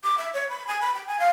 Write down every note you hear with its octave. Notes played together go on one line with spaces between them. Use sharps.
D6
E5
C#5
B5
G#5
B5
G5
G#5
F5